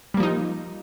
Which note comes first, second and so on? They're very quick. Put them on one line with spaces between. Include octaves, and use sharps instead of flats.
G3 A#3 F3 D#4